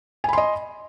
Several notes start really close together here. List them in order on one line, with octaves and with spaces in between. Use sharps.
G#5 B5 C6 D#5